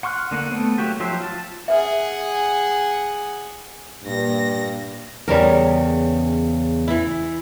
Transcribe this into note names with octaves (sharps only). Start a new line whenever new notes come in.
F#5 C6 C#6 F6 F#6
D3 A#3 F#5
A3 B3 C4
F#3 A3 A#3 F#4 G4
F3 F#3 G4 C5 E5
F4 A5
G#4 B4 E5 F#5
G2 A#2 A#6
E2 C#3 G3 C#4 A#4
E3 E4